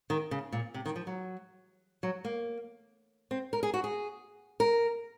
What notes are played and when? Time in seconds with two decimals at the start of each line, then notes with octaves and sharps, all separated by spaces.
0.10 D#3
0.31 C#3
0.52 A#2
0.74 C3
0.86 D#3
0.96 F3
1.07 F#3
2.03 F#3
2.25 A#3
3.31 C4
3.53 A#4
3.63 G#4
3.74 F#4
3.84 G#4
4.60 A#4